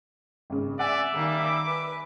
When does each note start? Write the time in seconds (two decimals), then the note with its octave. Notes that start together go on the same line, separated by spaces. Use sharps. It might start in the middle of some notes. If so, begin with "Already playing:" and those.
0.50 G#1 C#3
0.79 D5 E5 F#5 G#5
1.12 D#3 G3 A#3 D6
1.66 B4